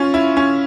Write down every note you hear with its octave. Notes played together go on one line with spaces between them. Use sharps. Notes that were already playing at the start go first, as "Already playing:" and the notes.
Already playing: C#4 F4
E4
C#4